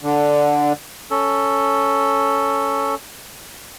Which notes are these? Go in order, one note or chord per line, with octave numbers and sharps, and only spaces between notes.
D3
C#4 A4